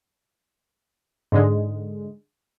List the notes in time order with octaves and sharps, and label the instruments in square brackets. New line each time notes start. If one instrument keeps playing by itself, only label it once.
[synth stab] G#2 D3 G#3